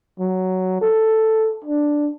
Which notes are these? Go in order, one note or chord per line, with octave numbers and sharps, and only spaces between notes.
F#3
A4
D4